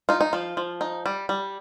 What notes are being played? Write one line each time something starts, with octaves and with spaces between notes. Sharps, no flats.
D#4 F4
D#4
F3 F4
F3
D#4
G3
G3